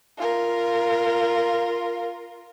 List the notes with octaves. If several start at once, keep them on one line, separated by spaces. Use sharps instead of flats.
F4 A#4